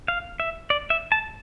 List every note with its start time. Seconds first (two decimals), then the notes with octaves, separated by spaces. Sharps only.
0.08 F5
0.40 E5
0.70 D5
0.90 E5
1.12 A5